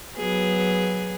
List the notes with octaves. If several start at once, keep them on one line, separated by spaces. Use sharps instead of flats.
F#3 B3 G#4